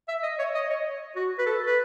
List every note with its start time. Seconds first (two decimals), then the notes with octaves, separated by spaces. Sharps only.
0.08 E5
0.23 D#5
0.39 C#5
0.55 D#5
0.70 C#5
1.16 F#4
1.39 B4
1.46 A4
1.66 B4